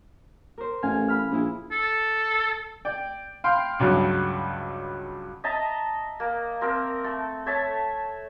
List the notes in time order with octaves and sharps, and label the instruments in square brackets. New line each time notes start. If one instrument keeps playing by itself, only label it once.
[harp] A#4 C5
[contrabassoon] A1 [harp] F5 G#5
[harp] F5 B5 F6
[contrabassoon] A#1 [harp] E4 G#4
[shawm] A4
[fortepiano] D5 G5
F5 G5 B5 C6
C#2 G2 F#3 F#5
[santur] D#5 E5 A5 A#5
A#3
C4 A#4 E6
A3 A4
A4 C#5 E5 A5